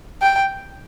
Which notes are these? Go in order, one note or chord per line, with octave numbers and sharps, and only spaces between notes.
G5